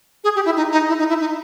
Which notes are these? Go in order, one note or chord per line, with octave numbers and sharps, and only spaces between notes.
G#4
G4
E4
D#4
D#4
E4
D#4
E4
D#4